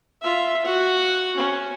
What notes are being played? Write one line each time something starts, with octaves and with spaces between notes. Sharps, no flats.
F4 E5
F#4 F#5
C#4